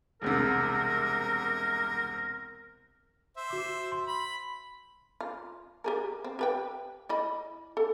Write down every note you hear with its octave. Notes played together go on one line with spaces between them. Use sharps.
E1 C2 C3 A#4
C5 E5
F#4 D6
C6
B5
F4
G4 G#4 A#4
C4
G4 B4 G5
E4 D#5 B5
A4